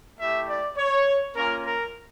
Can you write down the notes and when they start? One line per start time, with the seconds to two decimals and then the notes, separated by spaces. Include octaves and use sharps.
0.19 A3 E4 G4 E5
0.49 D5
0.78 C#5
1.36 A#3 C#4 F4 A#4
1.64 A#4